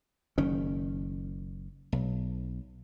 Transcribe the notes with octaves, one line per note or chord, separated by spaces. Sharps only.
F#1 D#3 C#4
B1